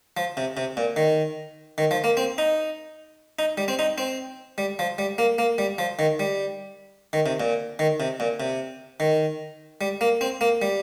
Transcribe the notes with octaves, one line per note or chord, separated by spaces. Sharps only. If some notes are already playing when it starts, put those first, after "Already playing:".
F3
C3
C3
A#2
D#3
D#3
F3
A#3
C4
D#4
D#4
G3
C4
D#4
C4
G3
F3
G3
A#3
A#3
G3
F3
D#3
G3
D#3
C3
A#2
D#3
C3
A#2
C3
D#3
G3
A#3
C4
A#3
G3